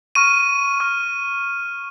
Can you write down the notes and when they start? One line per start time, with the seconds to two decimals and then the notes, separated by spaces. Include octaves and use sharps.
0.15 C#6 F6 D#7
0.80 C#6 F6